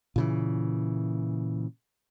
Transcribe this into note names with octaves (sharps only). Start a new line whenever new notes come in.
A#2 C#3 E3